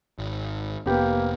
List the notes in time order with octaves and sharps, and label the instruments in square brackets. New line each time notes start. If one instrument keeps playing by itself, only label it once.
[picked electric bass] G#1
[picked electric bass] F1 [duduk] A#3 [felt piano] B3 G4 G5